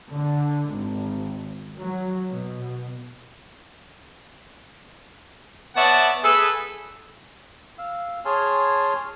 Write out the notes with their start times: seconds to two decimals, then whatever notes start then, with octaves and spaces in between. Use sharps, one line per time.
0.10 D3
0.73 G#1
1.78 F#3
2.29 B2
5.76 B3 C#5 D5 E5 F#5 A5
6.24 G#4 A4 B4
7.78 F5 E6
8.25 G#4 C#5 G#5 A5 C6 F6